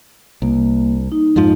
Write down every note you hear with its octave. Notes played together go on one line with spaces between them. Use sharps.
C2 A#3
D#4
F2 G#2 F3